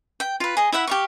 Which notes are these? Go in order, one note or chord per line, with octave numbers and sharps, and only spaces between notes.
G5
F4 B4
G#4 D#5
E4 E5 F#5 B5
G4 F5 C#6